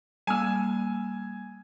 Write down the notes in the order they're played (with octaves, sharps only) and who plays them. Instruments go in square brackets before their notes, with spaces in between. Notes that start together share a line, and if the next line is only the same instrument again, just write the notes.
[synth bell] G3 A#3 [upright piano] G#5 E6